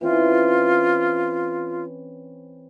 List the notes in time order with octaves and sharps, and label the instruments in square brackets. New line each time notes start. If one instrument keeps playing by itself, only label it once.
[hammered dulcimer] E3 C4 C#4 [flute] F4